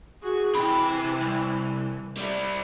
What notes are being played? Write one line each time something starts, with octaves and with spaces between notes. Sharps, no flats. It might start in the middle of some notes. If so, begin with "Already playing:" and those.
F#4 G#4
C3 E3 G5 B5
C2
G3 E4